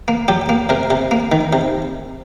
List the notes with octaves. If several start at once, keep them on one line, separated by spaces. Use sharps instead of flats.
A#3
F#3 G4
A#3
C3 A#4
C3
A#3
D#3
C3